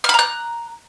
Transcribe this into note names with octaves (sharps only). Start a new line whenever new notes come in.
A#5 B5 F6 F#6